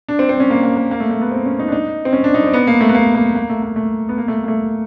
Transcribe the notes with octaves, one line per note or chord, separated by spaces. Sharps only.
D4
C4
C4
C#4
A#3
A#3
A#3
A#3
A3
A3
B3
C4
C#4
D#4
D4
D#4
C4
C#4
D4
D#4
C4
B3
A#3
A3
B3
A#3
A#3
A#3
A3
A#3
A3
B3
A#3
A3
A#3
A3